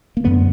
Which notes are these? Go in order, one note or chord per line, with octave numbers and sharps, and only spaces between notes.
A#3
F#2 D3 B3